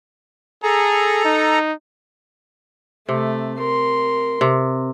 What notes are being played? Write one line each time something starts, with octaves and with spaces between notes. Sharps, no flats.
G#4 A4 A#5
D#4
C3 A3
A#4 C6
C3